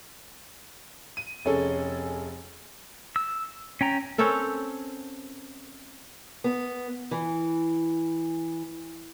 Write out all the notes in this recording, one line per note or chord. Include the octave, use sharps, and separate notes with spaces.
D#7
F1 C#4 G#4 A4
E6
C#4 G5 A#5
C4 C#4 A4 A#4
B3
E3